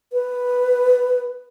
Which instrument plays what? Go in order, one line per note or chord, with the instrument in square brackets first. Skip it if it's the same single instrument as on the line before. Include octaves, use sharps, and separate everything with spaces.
[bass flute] B4